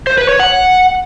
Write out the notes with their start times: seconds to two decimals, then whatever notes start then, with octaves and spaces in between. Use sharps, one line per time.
0.07 C5
0.18 B4
0.29 C#5
0.40 F#5